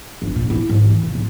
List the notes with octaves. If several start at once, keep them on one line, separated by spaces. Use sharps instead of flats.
G1
A#2
E4
G#1
E3
F1
A2